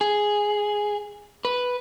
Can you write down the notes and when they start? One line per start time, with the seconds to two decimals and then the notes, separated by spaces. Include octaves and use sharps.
0.01 G#4
1.45 B4